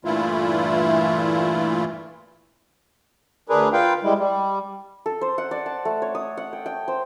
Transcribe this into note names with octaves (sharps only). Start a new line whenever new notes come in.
G2 A#2 E3 A3 E4 F4
D2 D4 G#4 A#4 B4
F4 B4 F5 G5
G3 G#3 E4
G3
A4
C5
F#5
D5
A5
A3
C#5
D#6
F#5
G5
G5
C5